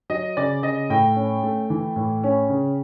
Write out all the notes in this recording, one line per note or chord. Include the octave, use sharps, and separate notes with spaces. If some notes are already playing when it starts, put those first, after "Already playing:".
F#3 D#5
C#3 D5
C#3 D#5
A2 G5
C#4
A3
E3
A2
C#4
C#3